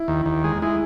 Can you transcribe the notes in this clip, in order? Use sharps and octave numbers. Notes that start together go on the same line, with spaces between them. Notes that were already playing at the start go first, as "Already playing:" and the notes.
Already playing: E4
D#2
D#2
G#3
G#3 E4